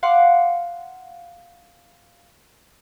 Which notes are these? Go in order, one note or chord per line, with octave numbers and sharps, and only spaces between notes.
F5 F#5 C6 D6